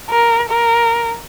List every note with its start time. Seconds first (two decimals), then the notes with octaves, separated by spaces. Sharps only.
0.10 A#4
0.49 A#4